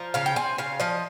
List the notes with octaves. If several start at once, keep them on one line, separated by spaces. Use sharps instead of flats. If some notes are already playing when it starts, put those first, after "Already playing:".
Already playing: F3 A#5
C#3 F5
G5
C4 G#5
C#3 F5
F3 D#5